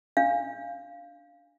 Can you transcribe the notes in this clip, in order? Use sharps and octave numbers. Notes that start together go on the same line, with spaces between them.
D4 F5